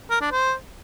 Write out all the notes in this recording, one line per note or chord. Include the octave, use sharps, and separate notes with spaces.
A#4
D4
C5